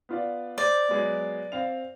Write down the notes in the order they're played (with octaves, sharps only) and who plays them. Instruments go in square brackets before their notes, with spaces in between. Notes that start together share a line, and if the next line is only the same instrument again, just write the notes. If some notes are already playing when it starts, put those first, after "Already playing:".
[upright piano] B3 F4 D5
[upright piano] C5 [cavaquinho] D5
[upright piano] F#3 G#3 B3
C4 F5 F7